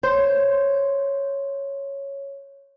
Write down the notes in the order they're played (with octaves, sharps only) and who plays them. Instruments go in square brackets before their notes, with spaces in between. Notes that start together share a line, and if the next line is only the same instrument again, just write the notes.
[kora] C5 [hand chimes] C#5